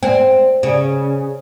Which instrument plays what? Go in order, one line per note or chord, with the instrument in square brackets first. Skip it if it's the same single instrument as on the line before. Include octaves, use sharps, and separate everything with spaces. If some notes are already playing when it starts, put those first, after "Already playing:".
[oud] C4
C#3